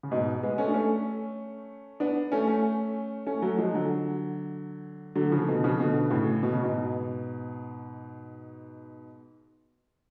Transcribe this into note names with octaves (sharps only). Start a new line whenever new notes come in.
C#3
G#2 B2
G#3 B3
A3 C#4
D4
A3 C#4
B3 D4
A3 C#4
A3 C#4
A3 C#4
F#3 A3
F3 G#3
D3 F#3
D3 F#3
C#3 F3
B2 D3
C#3 F3
B2 D3
A2 C#3
B2
C#3
G#2 B2